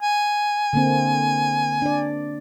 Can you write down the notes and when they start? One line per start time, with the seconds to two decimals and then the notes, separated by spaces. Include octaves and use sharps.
0.03 G#5
0.73 D3 A#3 C4
1.82 D4 D5